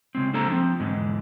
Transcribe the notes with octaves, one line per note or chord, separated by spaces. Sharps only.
C#3 G#3 C4
A#3 D4 A4 C5 A#5
F3 C4
E2 G#2 D3 G#3